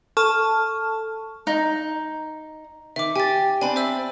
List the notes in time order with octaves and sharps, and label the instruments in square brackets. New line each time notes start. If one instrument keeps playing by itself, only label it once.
[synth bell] A4 A5 C#6 F6
[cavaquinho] D#4
[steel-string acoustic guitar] D#3 [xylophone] E5 D6
[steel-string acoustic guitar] G4 [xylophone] G#5 A6
[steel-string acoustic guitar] C4 D4 [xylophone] G#5 B5
[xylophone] C5 E5 E6